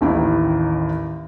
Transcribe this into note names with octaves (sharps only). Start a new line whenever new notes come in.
A1 D#2 D#3 E4